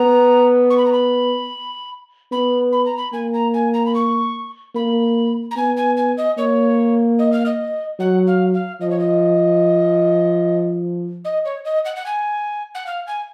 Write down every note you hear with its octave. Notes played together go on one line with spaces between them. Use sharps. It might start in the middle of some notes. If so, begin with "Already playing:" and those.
Already playing: B3 A#5
C#6
B5
A#5
B5
B3 B5
B5
A#5
B5
A#3 G#5
A#5
G#5
A#5
B5
C#6
A#3 B5
A#5
B3 G#5
G#5
G#5
D#5
A#3 C#5
D#5
F5
D#5
F#3 F#5
F5
F5
F3 D#5
C#5
D#5
D#5
C#5
D#5
F#5
F#5
G#5
F#5
F5
G#5